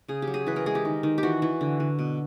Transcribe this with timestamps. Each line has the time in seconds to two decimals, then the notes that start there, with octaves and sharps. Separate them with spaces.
0.08 C#3 G#4
0.22 G4
0.27 F#3
0.34 G#4
0.47 E3 B4
0.56 A#4
0.66 G#3 G#4
0.75 G4
0.85 D#3
1.03 D#3
1.18 G4
1.23 E3 F#4
1.42 E3
1.61 D3
1.80 D3
1.99 B2